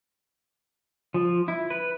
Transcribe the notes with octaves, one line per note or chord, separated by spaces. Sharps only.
F3
E4
B4